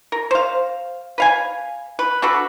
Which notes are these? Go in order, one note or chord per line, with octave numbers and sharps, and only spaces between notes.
A#4
C5 F5
B4 F5 G#5
B4
D4 F#4 A4 B4